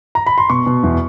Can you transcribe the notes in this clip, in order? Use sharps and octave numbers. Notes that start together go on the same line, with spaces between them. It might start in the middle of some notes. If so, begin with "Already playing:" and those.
A#5
B5
C6
B2 C#6
B2
E2